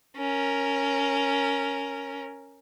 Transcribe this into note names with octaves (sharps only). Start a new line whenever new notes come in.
C#4 A#4